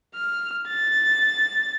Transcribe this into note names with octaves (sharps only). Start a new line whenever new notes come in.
F6
A6